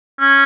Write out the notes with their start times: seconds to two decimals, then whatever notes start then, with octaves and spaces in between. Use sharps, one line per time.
0.20 C#4